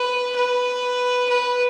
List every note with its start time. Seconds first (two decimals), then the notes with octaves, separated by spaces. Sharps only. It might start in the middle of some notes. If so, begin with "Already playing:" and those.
Already playing: B4
0.36 B4
1.29 B4